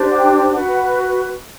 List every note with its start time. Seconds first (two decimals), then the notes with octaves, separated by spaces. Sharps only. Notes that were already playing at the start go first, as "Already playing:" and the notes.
Already playing: D4 G4 C5
0.11 F#5
0.16 G5
0.53 F#4 B4 F#5